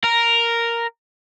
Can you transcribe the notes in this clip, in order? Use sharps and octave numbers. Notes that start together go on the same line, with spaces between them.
A#4